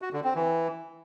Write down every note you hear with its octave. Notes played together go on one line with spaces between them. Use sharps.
F#4
D3
C4
E3